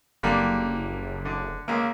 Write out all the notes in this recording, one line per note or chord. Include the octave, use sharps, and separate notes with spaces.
F#1 D3 G3 A#3
D3
C#2 A#3